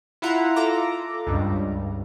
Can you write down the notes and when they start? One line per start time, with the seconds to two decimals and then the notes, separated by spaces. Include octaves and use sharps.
0.22 E4 F4 E5 F#5 A#5
0.56 F4 A4 A#5 D6
1.27 C#2 G2